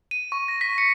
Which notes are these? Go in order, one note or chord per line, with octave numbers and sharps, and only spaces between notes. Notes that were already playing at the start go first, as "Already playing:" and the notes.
D#7
C#6
A#6
B6
C#7